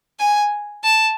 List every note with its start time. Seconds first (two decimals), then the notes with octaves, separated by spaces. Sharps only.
0.19 G#5
0.84 A5